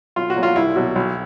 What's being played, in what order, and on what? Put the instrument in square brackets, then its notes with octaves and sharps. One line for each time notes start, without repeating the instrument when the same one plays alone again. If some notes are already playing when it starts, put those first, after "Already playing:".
[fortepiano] B1 F4
F#4
A#2 F#3
F4
C2 E4
B2 F#3
B1